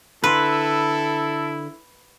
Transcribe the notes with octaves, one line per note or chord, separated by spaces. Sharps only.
D3 E4 A4 B4 C6